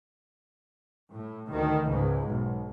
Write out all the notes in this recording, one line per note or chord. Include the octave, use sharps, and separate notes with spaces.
A2
D2 D#3
C#2 G#2
B1